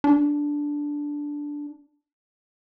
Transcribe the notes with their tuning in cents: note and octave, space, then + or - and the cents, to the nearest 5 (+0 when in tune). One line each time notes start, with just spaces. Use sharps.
D4 -5